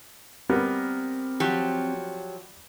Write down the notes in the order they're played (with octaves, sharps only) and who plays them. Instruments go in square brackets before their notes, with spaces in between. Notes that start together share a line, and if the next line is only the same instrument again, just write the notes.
[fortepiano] G3 B3 A#4 [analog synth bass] C4
[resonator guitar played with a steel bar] F3 F#3 G4